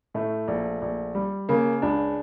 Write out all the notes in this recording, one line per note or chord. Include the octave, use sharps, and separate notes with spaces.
A2 A3
A#1
A#1
G3
C#3 A#3
C#2 D4